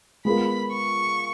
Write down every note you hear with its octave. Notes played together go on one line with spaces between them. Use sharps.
G#3 B3 F4 A#4 B5
C#6